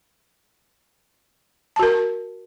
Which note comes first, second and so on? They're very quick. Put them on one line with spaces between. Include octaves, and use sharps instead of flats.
A5 F#4 A#4